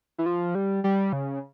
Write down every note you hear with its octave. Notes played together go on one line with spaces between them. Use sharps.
E3
F3
G3
G3
C#3